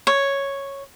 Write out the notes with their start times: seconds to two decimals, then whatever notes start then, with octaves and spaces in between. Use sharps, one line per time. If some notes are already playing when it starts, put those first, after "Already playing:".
0.07 C#5